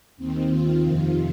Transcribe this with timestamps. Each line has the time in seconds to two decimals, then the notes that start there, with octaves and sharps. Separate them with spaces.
0.17 D#2 D#3 C4
0.50 F4
0.83 F2 C3 D#3